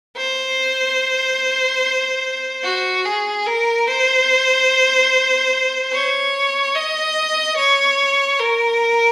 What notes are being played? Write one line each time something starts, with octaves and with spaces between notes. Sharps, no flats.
C5
F#4
G#4
A#4
C5
C#5
D#5
C#5
A#4